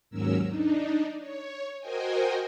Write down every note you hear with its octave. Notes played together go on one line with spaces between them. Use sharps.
D#2 G#2 F#3 C#4 A#4 E6
D4 D#4
C#5
F#4 A#4 C5 D#5 G5 G#5